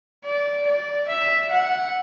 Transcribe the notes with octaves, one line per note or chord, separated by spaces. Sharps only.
D5
D5
E5
F#5